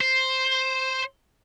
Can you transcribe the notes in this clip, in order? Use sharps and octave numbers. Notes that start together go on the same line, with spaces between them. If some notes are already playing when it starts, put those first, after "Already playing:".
C5